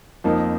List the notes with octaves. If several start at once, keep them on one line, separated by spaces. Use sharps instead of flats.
F2 F3 A#3 D#4